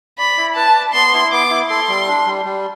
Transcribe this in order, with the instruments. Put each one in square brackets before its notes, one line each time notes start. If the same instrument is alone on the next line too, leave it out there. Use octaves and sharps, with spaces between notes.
[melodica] D5 [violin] B5
[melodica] E4
[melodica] B4 [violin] A5
[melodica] D5
[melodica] B3 [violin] C6
[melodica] E4
[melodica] B3 [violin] D6
[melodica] E4
[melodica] A4 [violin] C6
[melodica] G3
D4
G3
G3